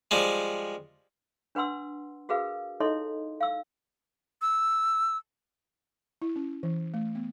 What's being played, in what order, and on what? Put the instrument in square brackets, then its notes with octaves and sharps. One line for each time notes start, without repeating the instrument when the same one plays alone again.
[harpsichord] F3 G3 G#3
[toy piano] D4 B4 F#5 C6 E6
F#4 G#4 A#4 B4 F5
D#4 E4 A4 C#5 D#5 C6
F5 E6
[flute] E6
[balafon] E4
C#4
E3
A3
B3